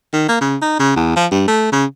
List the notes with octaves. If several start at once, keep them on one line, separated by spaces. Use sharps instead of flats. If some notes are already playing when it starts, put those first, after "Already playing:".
D#3
A#3
C#3
D#4
C#3
E2
F3
G2
A3
C#3